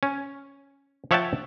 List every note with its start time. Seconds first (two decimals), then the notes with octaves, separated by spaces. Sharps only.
0.03 C#4
1.11 F3 C#5 E5 F#5 G5 A5